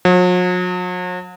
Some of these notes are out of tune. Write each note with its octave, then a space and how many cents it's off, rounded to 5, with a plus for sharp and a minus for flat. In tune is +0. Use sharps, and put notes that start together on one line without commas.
F#3 -45